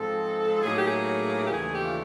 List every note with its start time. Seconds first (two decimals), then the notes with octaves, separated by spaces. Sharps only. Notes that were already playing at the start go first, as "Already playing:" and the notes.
Already playing: G#2 F3 G#3 C4 A4
0.63 A2 F#3 A#3 D#4 G#4
0.74 G4
0.85 G#4
1.44 G4
1.51 D#2 C#3 E3 A3 D4 G#4
1.72 G4
1.83 F4